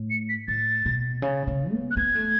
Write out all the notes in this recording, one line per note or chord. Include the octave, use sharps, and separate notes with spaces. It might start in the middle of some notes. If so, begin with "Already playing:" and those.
Already playing: A2
C#7
B6
A2 A6
B2
C#3
C#3
B3
F#6
B3 G#6
A3